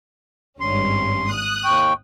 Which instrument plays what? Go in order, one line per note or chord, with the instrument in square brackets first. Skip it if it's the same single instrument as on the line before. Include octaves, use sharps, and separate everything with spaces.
[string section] G#1 G2 C#4 [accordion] C6
[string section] D#6 F#6
[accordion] D#2 G5 [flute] C#6